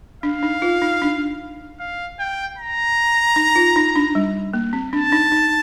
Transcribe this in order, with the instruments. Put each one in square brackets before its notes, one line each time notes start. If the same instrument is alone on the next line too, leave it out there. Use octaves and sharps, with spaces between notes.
[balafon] D4 [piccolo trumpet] F5
[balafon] D#4
F4
D#4
D4
[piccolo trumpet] F5
G5
A#5
[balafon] D#4
F4
D#4
D4
G3
A#3
C4
[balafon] D4 [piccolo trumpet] A5
[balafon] D#4
D#4